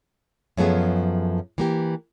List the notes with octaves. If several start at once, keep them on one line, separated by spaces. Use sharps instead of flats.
F#2 F3 A3 B3 G#4
E3 A#3 G4